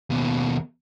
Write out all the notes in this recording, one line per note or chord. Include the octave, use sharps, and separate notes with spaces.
D#2 B2